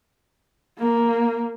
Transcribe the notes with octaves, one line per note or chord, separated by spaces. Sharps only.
A#3